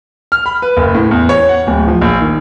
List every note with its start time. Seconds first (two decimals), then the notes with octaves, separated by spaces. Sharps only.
0.32 F6
0.46 B5
0.62 B4
0.77 F#1
0.95 A2
1.11 E2
1.29 C#5
1.49 F#5
1.67 D1
1.87 F3
2.01 A#1
2.21 D#3